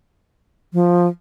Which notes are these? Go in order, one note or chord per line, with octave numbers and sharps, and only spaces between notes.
F3